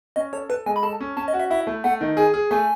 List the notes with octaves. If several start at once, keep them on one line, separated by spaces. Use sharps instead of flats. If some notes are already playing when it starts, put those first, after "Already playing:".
C#4 D#5
A4 C#5
A4 B4
G#3 G#5
B5
A4 A5
C#4
C#4 A5
D#5
F#4
E5
E4 E5
A3
A3 F#5
D#3
G#4 G#5
G#4
A3 G#5